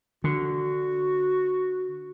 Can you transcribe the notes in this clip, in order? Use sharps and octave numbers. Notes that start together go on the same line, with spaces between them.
D3 F#4